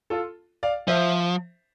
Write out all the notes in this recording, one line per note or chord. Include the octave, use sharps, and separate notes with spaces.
F4 A4
D5 F5
F3 C5 E5